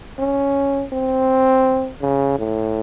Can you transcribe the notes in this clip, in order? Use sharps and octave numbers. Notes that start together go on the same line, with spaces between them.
C#4
C4
C#3
A2